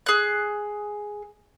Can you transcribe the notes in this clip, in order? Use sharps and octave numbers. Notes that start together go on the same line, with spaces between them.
G#4 F#6